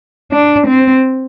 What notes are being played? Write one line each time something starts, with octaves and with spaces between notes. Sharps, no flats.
D4
C4